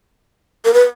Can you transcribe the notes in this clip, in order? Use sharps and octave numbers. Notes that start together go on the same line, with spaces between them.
A#4
B4